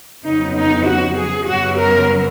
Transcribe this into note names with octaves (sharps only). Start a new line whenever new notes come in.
F2 C#3 F#3 B3 D#4
D#4
F#4
G#4
F#2 C#3 F#3 B3 F#4
A#4